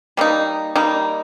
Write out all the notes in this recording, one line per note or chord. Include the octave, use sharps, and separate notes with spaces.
G3 A#3 D#4
G3 A#3 D#4